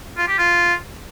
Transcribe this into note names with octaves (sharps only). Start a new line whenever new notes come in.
F4
G4
F4